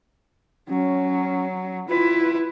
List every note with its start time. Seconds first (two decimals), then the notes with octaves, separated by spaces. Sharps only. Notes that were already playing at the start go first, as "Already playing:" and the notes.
0.69 F#3 C#4
1.89 E4 F4 B4